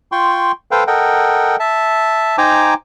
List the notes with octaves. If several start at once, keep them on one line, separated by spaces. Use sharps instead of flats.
F4 G5 C6 C#6
A4 B4 C5 F5 G5
A4 A#4 D#5 F#5 G5
E5 A5
D#4 C5 G5 G#5 A#5 D6